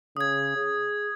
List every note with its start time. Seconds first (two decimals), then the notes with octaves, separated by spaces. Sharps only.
0.17 C#3 D#6 G#6
0.57 G#4